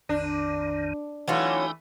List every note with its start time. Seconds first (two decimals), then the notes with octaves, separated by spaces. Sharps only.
0.09 A#1 F2 D#3 D4
1.28 E3 F#3 A3 C#4 D#4 F4 G5